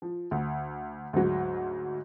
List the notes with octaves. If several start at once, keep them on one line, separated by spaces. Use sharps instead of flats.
F3
D2
D2 G#2 F#3